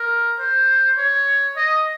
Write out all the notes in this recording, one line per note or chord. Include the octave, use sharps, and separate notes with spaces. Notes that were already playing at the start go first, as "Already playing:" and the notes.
Already playing: A#4
C5
C#5
D#5